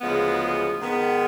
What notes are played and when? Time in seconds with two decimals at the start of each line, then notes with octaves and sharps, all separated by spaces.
0.01 D2 C#3 F3 G#3 B3
0.82 G#2 D#3 G#3 B3